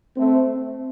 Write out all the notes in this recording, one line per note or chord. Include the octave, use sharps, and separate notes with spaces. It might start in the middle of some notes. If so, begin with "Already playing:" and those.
A3 C4